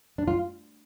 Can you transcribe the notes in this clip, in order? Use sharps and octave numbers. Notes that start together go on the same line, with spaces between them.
D4
F4